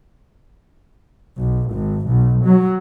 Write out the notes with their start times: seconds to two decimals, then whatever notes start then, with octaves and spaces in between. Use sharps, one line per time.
1.37 B1
1.71 G#1
2.07 B1
2.45 F#3